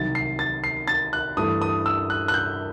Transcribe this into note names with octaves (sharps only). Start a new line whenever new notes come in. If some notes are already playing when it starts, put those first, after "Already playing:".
Already playing: C2 C3 D#3 F#3 A6
C7
A6
C7
A6
F#6
G2 E3 A3 D#6
D#6
E6
F#6
F#6
G6